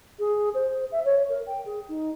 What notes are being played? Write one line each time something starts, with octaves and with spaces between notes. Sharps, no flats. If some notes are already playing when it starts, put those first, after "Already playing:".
G#4
C5
E5
C#5
A#4
G5
G#4
D#4